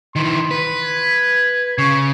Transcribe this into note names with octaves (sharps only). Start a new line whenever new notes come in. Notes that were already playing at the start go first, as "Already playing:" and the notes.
D#3 E3 C6
B4
G#6
C#3 C#6